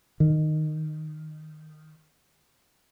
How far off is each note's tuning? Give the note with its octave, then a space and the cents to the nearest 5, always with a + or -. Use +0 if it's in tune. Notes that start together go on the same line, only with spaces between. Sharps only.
D#3 -10